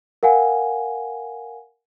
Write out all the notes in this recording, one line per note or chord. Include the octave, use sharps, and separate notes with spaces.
A#4 F5 F#5 G#5